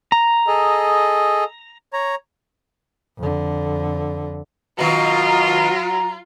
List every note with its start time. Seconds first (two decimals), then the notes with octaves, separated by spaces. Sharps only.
0.12 A#5
0.47 G#4 A4 D#5
1.93 C#5 A#5
3.18 F2 D3
4.79 B2 D#3 F#3 F4 A#5